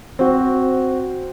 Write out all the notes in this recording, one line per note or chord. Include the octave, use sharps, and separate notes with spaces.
C4 F#4